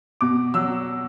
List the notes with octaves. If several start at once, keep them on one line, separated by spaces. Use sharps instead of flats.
B2 D6
F#3 E6